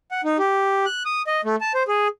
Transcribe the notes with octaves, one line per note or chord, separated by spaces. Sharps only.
F#5
D#4
G4
F#6
D#6
D#5
A3
A5
C5
G#4